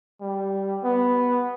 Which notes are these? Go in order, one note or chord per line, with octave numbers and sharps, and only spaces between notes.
G3
B3